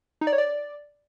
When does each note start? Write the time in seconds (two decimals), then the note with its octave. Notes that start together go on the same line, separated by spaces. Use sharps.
0.21 D#4
0.27 D5
0.33 C#5
0.38 D5